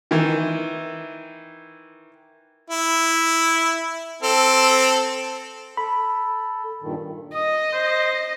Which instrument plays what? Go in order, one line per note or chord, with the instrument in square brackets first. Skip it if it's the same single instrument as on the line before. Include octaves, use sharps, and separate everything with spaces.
[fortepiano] D#3 E3
[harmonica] E4
C4 A4
[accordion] A4 [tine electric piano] B5
[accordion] G2 A#2 D#3
[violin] D#5 [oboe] D#6
[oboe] C5